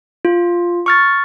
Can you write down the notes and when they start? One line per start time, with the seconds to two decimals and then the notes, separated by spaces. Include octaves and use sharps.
0.25 F4
0.86 C#6 F6 A6